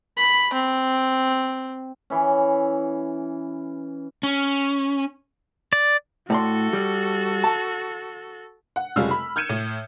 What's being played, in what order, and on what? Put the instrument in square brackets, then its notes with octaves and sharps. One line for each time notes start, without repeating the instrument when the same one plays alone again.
[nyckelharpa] B5
C4
[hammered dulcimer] E3 C#4
[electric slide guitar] C#4
[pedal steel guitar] D5
[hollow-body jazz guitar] A2 D5 C6 [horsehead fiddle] F#4 A4
[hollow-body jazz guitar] G3
A5
[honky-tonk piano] F#5
F1 C#3 G3 F4 E6 F6
B5
F6 G6 G#6 C#7 D#7 E7
A2